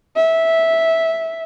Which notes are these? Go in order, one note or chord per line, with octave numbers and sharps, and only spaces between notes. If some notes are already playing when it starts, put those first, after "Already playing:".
E5